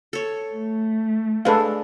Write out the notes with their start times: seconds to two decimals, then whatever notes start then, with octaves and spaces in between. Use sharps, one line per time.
0.13 A4 C#5
0.54 A3
1.45 G#3 D4 A4 B4 F5